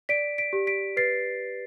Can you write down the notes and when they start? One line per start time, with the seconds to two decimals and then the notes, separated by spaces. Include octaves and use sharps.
0.09 D5 B6 D7
0.38 B6 D7
0.53 G4
0.67 B6 D7
0.97 B4 A6 C7